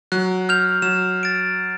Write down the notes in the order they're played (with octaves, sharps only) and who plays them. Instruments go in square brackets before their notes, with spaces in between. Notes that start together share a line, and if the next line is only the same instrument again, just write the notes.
[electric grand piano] F#3 [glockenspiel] F#6
[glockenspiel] F6 G6 F7
[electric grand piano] F#3 [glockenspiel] E7
[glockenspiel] A6 D7